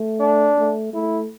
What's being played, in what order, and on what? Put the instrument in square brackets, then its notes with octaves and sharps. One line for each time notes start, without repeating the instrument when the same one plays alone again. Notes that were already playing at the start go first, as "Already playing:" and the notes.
Already playing: [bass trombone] A3
[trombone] D4
[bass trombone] A3
[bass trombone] A3 [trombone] E4